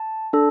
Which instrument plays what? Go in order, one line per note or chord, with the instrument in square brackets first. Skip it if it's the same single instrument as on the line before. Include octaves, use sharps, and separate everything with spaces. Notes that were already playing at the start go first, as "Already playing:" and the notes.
Already playing: [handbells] A5
D4 A4